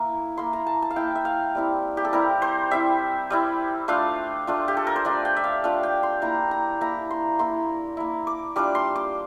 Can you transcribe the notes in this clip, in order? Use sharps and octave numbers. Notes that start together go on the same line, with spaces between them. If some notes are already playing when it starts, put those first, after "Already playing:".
Already playing: A#3 E4
A#3 E4 C6
A#5
A5
A5
F5
A#3 E4 G5
E5
F5
G3 C4 E4
G4
A4
G3 C4 E4 A#4
C5
G3 C4 E4 E5
G3 C4 E4
A3 D4 F4 F5
A3 D4 F4
G4
A4
A#4
C5
A3 D4 F4 D5
G5
E5
F5
A3 D4 F4 F5
G5
C6
A#3 E4 A#5
A#5
A#3 E4 A#5
C6
A#3 E4 C6
A#3 E4
D6
G3 D4 F4 D6
C6
D6